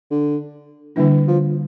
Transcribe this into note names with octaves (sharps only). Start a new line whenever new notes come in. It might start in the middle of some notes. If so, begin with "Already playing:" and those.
D3
D3 E3 G3 A#3 D4
F3